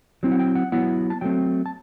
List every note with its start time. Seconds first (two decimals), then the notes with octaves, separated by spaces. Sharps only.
0.23 F#3 C4 E4
0.32 F#5
0.39 G5
0.55 F#5
0.72 F#3 B3 E4 F#5
1.10 A5
1.21 F#3 A3 C4 G5
1.66 A5